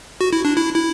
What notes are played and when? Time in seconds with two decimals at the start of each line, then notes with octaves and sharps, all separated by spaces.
0.21 F#4
0.33 E4
0.45 D4
0.57 E4
0.75 E4